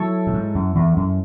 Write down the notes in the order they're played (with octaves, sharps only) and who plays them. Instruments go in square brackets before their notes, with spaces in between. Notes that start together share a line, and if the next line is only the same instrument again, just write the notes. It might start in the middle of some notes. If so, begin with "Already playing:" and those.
Already playing: [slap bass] F#3 [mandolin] E4 A4 C#5
[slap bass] A2
G#2
F#2
E2
F#2